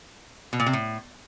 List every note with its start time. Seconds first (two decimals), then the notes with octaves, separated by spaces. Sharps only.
0.53 B2
0.60 A#2
0.66 C3
0.73 A2